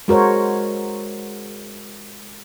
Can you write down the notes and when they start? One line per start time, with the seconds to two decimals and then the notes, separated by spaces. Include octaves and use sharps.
0.08 G#3 F#4 A#4 C5 C#5